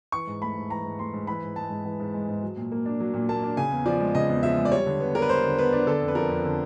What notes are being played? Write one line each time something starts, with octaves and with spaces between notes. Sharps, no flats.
E3 C#6
G#2
A3 B5
G#2
E3 A#5
G#2
A3 C6
G#2
E3 B5
G#2
G#3 A5
G#2
E3
G#2
G#3
G#2
F#3
A#2
A#3
D4
F#3
A#2
A#3 A5
D4
C#3 G#5
E2
F3 D5
G#3
C#3 D#5
E2
F3 E5
G#3
D5
G3 C#5
D3
B3
D4 A#4
B4
G3 C5
D3
B3 B4
D4
D3 A4
F2
B4
F3 A#4
F2
D3